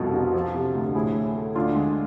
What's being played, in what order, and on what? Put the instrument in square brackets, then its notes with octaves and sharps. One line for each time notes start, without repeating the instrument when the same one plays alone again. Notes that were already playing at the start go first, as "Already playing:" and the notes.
Already playing: [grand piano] C2 F2 B2 F4 A4
B2
F3
C3
D2
A2 E4 G#4
A2
A3
D2 D4 F4
G#3